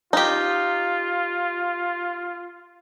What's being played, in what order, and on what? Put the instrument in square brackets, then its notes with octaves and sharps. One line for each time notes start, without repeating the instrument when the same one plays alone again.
[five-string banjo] D#4 G4 [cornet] F4